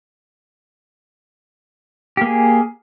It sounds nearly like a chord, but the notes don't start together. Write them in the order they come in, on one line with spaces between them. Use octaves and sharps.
G4 A#3 G#4